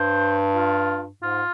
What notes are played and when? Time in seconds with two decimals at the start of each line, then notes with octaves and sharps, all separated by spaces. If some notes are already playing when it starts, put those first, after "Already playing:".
Already playing: G2 C5
0.56 F4
1.22 G#2 F4